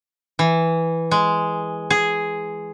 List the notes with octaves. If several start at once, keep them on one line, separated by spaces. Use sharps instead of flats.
E3
G#3
G#4